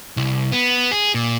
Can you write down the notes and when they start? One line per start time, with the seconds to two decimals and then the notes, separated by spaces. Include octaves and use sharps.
0.17 C2
0.52 B3
0.91 G#4
1.14 A#2